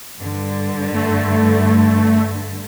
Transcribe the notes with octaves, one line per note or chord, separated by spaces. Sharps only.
G2 D3
A3